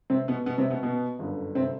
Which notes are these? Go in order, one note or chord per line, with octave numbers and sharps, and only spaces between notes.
C3 C4
B2 B3
B2 B3
C3 C4
B2 B3
B2 B3
G1 F#2 D3
C3 C4